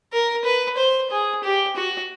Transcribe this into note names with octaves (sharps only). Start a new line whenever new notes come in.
A#4
B4
C5
G#4
G4
F#4